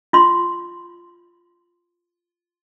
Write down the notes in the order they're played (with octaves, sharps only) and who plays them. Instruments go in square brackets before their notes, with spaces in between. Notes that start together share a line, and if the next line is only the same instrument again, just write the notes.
[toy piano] F4 C6